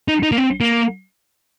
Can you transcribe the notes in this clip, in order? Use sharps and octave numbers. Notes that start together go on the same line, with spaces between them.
D#4
D#4
A#3
C4
A#3